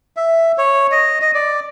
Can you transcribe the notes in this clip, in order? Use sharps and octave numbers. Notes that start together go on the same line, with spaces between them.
E5
C#5
D#5
D#5
D5